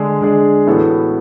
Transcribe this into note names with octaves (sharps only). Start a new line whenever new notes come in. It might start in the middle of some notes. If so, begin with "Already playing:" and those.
Already playing: D3 G#3 D4 G#4
D3 G#3 D4 G#4
A2 E3 B3 F#4 A4